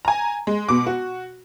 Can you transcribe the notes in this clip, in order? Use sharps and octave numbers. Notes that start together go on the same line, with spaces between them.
G#5 A#5
G#3
B2 D6
F#4